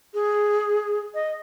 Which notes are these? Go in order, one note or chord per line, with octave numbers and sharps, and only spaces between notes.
G#4
D#5